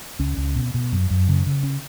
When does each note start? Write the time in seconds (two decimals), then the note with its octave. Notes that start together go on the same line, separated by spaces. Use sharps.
0.19 C#2 C#4
0.37 C#2
0.55 B2
0.74 B2
0.92 F#2
1.10 F#2
1.28 C#3
1.46 C#3
1.63 C#4